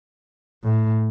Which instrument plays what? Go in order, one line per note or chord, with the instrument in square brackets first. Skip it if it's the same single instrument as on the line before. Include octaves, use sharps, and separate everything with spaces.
[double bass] A2